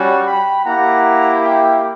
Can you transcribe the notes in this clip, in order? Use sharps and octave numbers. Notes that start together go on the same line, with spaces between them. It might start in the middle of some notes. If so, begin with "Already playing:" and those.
Already playing: G3 C#4 F#4
G5 B5
A#3 E4 G4 F#5 A#5
E5 G5